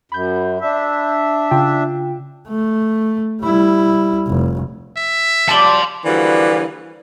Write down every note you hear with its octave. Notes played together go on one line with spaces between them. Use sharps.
F#2 B5 G6
D4 E5
C#3 F4 G5
A3
G3 E4
F1
E5
F3 G3 D5 A5 C6
D3 E3 F3 G3 A#3 F#4